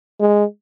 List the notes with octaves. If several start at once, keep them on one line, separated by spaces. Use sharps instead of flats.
G#3